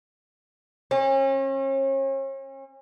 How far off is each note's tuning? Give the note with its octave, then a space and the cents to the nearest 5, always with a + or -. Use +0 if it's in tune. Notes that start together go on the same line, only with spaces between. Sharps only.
C#4 -40